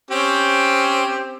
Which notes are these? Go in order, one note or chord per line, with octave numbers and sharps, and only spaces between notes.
C4 C#4 G4